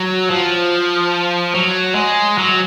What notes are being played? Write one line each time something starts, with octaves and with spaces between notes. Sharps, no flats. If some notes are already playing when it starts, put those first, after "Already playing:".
Already playing: F#3
F3
F#3
G#3
F#3